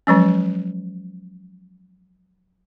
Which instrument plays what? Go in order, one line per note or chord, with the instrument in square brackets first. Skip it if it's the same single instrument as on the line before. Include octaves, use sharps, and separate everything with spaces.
[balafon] F3 F#3 G#3 C#4